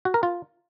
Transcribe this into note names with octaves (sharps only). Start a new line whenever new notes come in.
F#4
A#4
F4